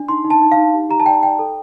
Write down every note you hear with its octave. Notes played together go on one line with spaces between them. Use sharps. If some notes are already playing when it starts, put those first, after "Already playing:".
Already playing: D4
D#4 C6
D#4
A5
D#4
F5
D#4
G4
G4 A#5
A5
D5 G5
D5 G5
A4